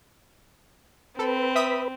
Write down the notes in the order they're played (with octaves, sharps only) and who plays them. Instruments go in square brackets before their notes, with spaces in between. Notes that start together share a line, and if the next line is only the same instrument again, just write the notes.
[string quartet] C4 [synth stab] A4 [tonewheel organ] B4
[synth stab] E5 D#6 B6